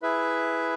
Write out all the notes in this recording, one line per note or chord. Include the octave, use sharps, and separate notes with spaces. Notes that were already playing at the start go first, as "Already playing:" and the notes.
E4 G#4 B4 E5